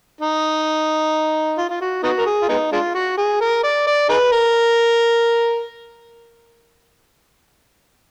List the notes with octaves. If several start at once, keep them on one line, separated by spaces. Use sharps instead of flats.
D#4
F4
F4
F#4
B3 D#4 F#4
A#4
G#4
F4
G#3 B3 D#4
G#3 D4 F4
F#4
G#4
A#4
D5
D5
D#4 G#4 B4
A#4